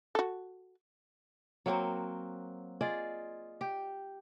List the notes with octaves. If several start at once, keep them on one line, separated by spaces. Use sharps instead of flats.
F#4 A4
F#3 A#3 C4 F#4
F4 G#4 D5 D#5
G4